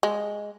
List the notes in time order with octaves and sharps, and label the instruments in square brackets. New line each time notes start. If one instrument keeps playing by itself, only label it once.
[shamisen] G#3